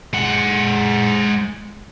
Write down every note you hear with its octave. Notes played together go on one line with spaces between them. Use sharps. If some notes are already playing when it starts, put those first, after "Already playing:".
G#3 F#5